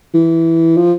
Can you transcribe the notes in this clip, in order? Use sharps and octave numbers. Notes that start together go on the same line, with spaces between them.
E3
F3